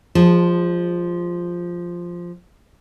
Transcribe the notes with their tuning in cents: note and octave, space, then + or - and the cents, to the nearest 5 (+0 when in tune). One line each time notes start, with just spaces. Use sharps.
F3 +0 G#3 -30 A5 +0